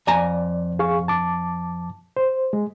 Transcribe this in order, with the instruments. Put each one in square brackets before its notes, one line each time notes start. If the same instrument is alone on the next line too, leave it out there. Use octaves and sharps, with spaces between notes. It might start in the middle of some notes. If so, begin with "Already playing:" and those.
[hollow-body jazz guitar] F2 G#5 A#5 [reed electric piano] D5
[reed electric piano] G#4 F5 C#6
A5 D6
C5
G#3